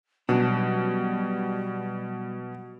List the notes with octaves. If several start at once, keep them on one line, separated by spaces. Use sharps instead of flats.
B2 F#3 G3 C#4 D4